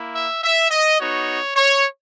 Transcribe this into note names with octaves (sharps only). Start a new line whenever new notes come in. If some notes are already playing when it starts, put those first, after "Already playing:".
Already playing: A#3 E4
E5
E5
D#5
B3 D#4 F#4 C#5
C#5